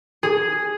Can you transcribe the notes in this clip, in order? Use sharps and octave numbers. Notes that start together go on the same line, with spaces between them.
G#4